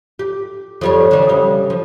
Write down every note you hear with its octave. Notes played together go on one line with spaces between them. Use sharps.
G4
F2 G3 C#5
D3 E3 E5
C#3 G3
F3